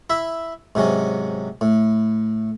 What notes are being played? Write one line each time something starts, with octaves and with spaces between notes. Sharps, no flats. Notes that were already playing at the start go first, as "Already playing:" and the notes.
E4 E5
G#2 C3 F#3 C#4
A2